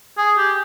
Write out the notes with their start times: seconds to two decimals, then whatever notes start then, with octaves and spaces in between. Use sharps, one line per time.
0.18 G#4
0.38 G4